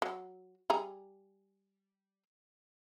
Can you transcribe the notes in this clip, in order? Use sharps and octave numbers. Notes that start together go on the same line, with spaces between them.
F#3
G3 G#4 A#5